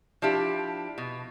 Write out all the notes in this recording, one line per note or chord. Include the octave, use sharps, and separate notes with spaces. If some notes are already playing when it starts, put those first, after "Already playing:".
F3 D4 E4 G4
B2